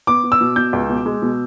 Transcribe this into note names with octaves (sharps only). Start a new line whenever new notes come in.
B3 D6
B3
E6
B2
B2 G6
C#2
B2
G#3
B2